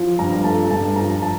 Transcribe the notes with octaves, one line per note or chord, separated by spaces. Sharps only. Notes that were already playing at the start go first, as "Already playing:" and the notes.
Already playing: F3
G2 A#5
A3 A5
G2 A5
F3 A#5
A5